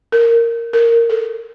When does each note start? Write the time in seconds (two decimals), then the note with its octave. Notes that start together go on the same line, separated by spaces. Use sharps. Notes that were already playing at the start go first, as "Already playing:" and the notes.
0.12 A#4
0.73 A#4
1.10 A4